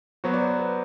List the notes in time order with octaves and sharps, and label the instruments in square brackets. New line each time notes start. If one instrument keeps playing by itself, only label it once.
[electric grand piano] F#3 B3 F#4 [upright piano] C5
[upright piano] D5
C5
B4